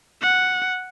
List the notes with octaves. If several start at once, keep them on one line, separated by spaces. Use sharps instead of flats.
F#5